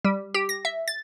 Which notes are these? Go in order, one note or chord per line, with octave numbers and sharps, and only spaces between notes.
G3
G4
A#6
E5
A6